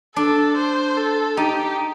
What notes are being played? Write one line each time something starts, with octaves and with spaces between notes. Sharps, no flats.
D4 A4
C5
A4
D#4 G4